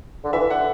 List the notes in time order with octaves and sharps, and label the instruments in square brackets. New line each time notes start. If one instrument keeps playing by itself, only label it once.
[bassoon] D3
[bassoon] E3 [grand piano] E5
[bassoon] D3 [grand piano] F#5